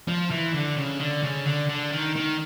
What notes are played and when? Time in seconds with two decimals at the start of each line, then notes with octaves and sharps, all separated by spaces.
0.08 F3
0.31 E3
0.54 D3
0.77 C#3
1.00 D3
1.23 C#3
1.46 D3
1.69 D3
1.92 D#3
2.15 D#3